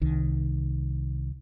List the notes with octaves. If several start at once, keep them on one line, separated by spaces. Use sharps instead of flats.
C2 D#3